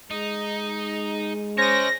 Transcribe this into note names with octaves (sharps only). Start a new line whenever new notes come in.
G#3 D#4
C#4 C5 C#5 D#5 A#6